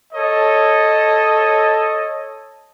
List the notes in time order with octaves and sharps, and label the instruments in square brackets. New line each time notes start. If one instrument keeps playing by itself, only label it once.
[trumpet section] A4 C#5 D#5